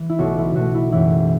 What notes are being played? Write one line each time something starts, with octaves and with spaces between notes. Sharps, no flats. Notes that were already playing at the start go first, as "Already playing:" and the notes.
Already playing: E3
E4
B1 B2 A3 F#4
E4
B1 B2 A3 F#4
E4
F#1 F#2 E3 E4